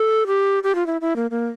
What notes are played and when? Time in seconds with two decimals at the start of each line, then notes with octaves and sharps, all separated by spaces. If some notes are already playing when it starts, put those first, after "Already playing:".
Already playing: A4
0.27 G4
0.63 G4
0.75 F4
0.87 E4
1.01 E4
1.16 A#3
1.31 A#3